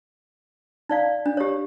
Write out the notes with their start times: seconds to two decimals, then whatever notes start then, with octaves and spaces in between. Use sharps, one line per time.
0.89 D#4 D5 F5
1.26 D4
1.37 G4 C#5